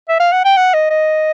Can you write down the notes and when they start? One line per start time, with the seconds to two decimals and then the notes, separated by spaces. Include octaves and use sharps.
0.09 E5
0.20 F5
0.33 F#5
0.45 G5
0.57 F#5
0.74 D#5
0.91 D#5